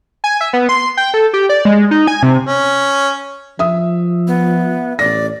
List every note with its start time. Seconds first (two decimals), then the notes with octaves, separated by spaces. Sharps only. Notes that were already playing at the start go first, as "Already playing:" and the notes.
0.24 G#5
0.41 E5
0.53 B3
0.69 C6
0.97 G5
1.14 A4
1.34 G4
1.49 D5
1.65 G#3
1.91 D#4
2.07 G#5
2.23 C3
2.47 C#4
3.59 F3 E5 D#6
4.27 B3
4.99 A1 D5 A#6